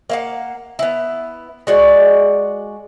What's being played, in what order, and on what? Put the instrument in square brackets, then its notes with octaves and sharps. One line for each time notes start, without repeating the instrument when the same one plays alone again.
[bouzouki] A#3 F5 F#5
B3 E4
G#3 F#4 D5